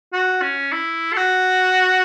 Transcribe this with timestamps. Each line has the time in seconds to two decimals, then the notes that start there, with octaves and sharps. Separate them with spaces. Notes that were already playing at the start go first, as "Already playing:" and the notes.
0.13 F#4
0.42 C#4
0.72 E4
1.13 A4
1.17 F#4